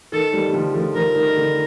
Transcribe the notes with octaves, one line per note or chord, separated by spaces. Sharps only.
D#3 A4
D#3 G3
G3
D3 F3
F3 A3
D3 F3 A#4
D#3
D3